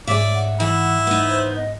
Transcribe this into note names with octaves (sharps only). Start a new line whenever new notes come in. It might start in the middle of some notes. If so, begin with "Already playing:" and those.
G#2 G#4 C#5 D5 E5
F#5
E3 E4
B3 D#4
C5
D#5